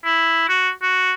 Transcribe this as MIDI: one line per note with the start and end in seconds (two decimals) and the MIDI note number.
0.05 0.44 64
0.49 0.70 66
0.82 1.13 66